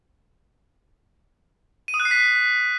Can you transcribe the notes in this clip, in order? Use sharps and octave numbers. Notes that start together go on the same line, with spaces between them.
D#7
D#6
F#6
C7
B6